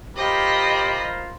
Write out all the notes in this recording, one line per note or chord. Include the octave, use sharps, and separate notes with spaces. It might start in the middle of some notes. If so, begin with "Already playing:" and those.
F4 G4 A#4 C5 D#5 B5